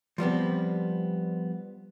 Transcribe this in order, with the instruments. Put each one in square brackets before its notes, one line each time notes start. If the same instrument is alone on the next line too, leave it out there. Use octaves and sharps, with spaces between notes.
[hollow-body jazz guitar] F3 G3 B3 C4